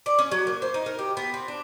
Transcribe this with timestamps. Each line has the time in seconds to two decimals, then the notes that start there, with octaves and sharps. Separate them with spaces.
0.06 D5
0.19 C#4
0.31 F#3
0.47 A#3
0.62 C5
0.74 D#4
0.86 A#4
0.99 G4
1.17 B3
1.34 C4
1.48 D4